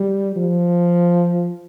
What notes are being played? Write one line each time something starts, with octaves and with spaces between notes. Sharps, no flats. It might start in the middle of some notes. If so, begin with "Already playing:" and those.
Already playing: G3
F3